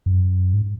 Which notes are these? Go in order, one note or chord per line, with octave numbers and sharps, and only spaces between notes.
F#2
G#2